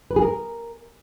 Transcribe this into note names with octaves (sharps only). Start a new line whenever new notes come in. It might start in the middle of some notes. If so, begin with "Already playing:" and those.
B4
G#4
A#4